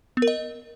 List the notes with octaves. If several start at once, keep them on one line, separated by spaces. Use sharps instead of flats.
B3
A#4
D#5